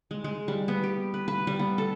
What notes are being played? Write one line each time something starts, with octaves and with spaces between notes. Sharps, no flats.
G#3
G#3
G3
B3
G4
B4
B4
G3
B3
A4